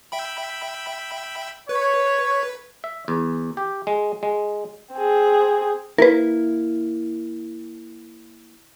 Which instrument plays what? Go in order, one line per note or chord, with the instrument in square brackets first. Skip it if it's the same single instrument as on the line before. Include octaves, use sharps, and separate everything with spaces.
[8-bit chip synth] E5 G5 B5
[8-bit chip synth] B4 [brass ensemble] C#5
[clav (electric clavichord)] E5
E2
G4
G#3
G#3
[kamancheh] C4 G#4
[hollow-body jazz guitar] A#3 E4 [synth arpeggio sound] A#4 B4